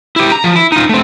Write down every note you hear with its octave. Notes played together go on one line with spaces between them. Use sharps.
E4 G4
A#5
F3
E4
D#4 F4
A3 C4